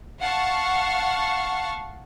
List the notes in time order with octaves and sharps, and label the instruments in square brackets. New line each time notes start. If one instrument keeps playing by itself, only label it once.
[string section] F5 F#5 A5 C#6